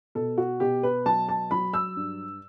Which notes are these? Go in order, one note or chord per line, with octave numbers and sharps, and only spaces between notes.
B2 A4
F#4
B2 G4
B4
F#3 A5
A5
F#3 B5
E6
G2